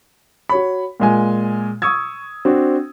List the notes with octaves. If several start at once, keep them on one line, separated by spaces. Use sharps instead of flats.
F#4 C#5 B5
A#2 G#3 G#5
C#6 D#6 E6 G#6
C4 D4 F#4